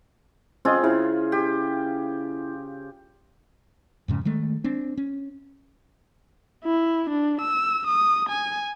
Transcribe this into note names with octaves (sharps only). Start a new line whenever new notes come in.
C4 C#4 F4 G#4 D#5
C#3 E4
G4
F2 G#2 C#3
D#3 G#3 A3
C4 D4
C#4
E4
D4
E6
D#6
G#5